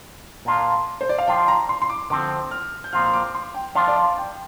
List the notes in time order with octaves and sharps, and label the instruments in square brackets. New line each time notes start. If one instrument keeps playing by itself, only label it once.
[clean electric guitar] A#2 A#3 D4 F4
[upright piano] C5
D5
F5
[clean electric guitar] F3 D4 F4 [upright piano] G5
[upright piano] A#5
C6
C6
D6
[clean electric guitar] D3 F3 C4 [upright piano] D6
[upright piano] F6
G6
[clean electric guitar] A#2 F3 C4 F4 [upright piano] F6
[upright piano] F6
D6
C6
G5
[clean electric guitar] F3 D4 F4 [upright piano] F5
[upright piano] D5
F5
G5